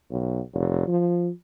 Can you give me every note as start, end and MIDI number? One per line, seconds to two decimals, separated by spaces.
0.11 0.40 35
0.53 0.85 29
0.88 1.29 53